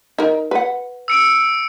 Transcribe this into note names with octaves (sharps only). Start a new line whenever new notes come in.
D#4 A#4
B4 F#5
E6 C#7 D7